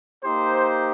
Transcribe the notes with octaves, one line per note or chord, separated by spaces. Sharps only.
A#3 D#4 G4 C5